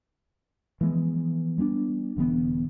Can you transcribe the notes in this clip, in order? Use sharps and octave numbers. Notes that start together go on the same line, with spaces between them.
E3 F3 G#3 B3
G3 B3 C4 D4
E1 D3 E3 B3